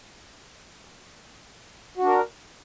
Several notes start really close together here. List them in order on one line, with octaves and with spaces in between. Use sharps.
F#4 D4 A#4